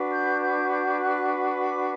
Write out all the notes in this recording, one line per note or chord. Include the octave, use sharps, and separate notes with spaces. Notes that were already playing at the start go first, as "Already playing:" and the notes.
Already playing: D4 F#4 B4
G6
G6
G6
F#6
D6